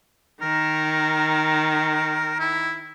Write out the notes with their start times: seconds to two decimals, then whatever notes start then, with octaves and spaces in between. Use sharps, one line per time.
0.42 D#3 A#4
2.39 E4